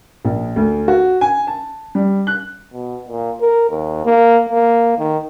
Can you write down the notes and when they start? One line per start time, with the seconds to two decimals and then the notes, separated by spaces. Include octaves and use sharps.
0.25 A#1
0.56 D2
0.88 F#4
1.21 G#5
1.47 A5
1.95 G3
2.27 F#6
2.73 B2
3.08 A#2
3.40 A#4
3.70 D#2
4.05 A#3
4.49 A#3
4.98 D#3